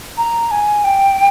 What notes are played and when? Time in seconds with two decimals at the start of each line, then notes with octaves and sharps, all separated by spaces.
0.17 A#5
0.51 G#5
0.84 G5